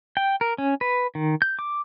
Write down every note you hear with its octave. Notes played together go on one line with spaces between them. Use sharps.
G5
A#4
C#4
B4
D#3
G6
D6